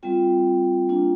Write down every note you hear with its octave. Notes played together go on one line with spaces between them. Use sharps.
G3 C4 F4 G5
A#3 D4 F4